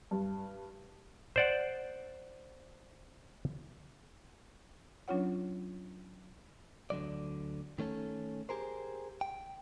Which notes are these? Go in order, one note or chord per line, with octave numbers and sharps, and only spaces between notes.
G2
C5 D5 F#5
F#3 C#4 D4 F4 C#5 F#5
D2 D3 F#3 D5
D#3 A3 C#4 A4
G4 G#4 A#4 C5
G5